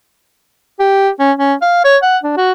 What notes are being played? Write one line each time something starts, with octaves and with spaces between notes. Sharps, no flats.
G4
C#4
C#4
F5
C#5
F#5
D4
F#4